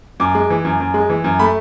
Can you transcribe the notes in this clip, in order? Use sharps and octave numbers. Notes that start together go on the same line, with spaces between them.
F#2 D6
G#3
E3
F#2
F#2
G#3
E3
F#2
A3 B5